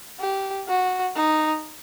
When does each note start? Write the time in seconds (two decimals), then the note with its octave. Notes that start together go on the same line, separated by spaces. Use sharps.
0.20 G4
0.68 F#4
1.16 D#4